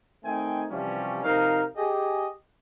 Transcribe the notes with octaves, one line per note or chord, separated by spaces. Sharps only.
D#3 A3 C4 D#4 G5 G#5
C3 E3 F3 G3 C#4
C3 F3 D#4 A#4 F5
G4 G#4 D#5